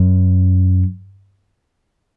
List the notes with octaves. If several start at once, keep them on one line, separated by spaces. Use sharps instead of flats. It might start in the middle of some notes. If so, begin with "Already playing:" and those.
Already playing: F#2